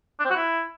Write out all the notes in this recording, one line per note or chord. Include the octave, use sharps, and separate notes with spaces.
D4
C4
F#4
E4